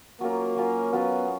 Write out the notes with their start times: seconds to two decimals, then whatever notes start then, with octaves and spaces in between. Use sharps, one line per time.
0.21 F#3 A#3 C#4 F4 A#4
0.56 F#3 C#4 F4 A#4
0.93 F#3 B3 C#4 F4 A#4